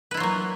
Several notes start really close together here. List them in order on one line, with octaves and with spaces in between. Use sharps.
B4 E4 F4 F#3 A#3